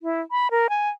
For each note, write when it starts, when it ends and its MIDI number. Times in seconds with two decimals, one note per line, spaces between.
0.03 0.21 64
0.31 0.51 83
0.51 0.67 70
0.70 0.89 80